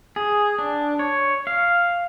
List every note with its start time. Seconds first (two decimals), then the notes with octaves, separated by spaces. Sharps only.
0.16 G#4
0.58 D4
0.99 C#5
1.47 F5